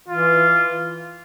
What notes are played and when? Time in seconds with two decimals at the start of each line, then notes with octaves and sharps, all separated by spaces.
0.08 E3 F4